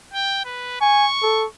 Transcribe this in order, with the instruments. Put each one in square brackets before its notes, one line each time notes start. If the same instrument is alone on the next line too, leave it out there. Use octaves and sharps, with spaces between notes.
[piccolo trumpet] G5
B4
[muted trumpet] G#5 [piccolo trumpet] C#6
[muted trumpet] A4